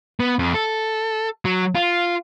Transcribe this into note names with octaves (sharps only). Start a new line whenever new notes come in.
B3
F2
A4
F#3
F4